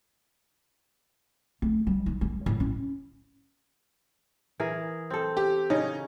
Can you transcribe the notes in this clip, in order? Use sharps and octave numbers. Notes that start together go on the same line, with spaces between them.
A3
G3
D#4
G#3
A2
C#4
E3 G#4 A#4
C4 A4
G4
C#3 C#4 D#4